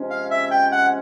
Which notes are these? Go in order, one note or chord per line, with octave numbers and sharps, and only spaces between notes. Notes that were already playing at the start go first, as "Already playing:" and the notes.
Already playing: C3 F3 G#3 C#4
F5
E5
G5
F#5